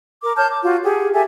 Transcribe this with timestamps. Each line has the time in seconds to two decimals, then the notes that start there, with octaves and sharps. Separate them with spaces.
0.22 A#4 D6
0.36 C#5 A5 F6 G6
0.50 D6
0.64 F4 F#4
0.83 G4 G#4 F#5
1.13 G4 A4 E5 G#5